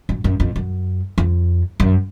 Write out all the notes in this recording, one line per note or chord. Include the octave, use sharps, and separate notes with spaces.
F#2
F#2
F2
F#2
F2
F#2